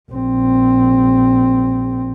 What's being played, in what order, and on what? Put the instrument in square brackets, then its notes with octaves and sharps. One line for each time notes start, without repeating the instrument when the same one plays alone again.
[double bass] A#1 C4